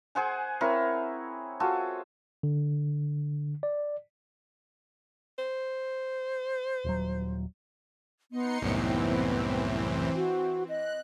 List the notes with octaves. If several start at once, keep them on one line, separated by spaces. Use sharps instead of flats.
G#4 C5 F#5 G#5
C4 E4 A#4 C#5
F4 F#4 G#4 A4
D3
D5
C5
D#1 F#3
B3 D#4 C6 C#7
C2 F#2 A2 E3 B3 C4
F#4
D#5 F#6